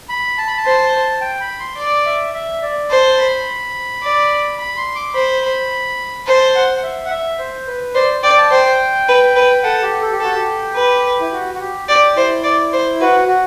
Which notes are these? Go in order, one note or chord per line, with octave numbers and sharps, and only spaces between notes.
B5
A5
B5
A5
C5
G5
B5
C6
D5 D6
E5
E5
D5
C5 A5
B5
D5
B5
C6
D6
C5 B5
B5
C5 A5
F#5
F#5
E5
F#5
E5
C5
B4
C5 D5
D5 G5
A5
C5 G5
B4
B4
A4 F#5
G4
A4
G4
F#4 A4
G4
B4
E4
F#4
F#4
G4
G4 D5
E4 C5
D5
C5
F#4 B4
F#4